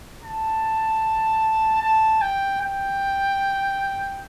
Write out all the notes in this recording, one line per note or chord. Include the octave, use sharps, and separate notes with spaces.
A5
A5
G5
G5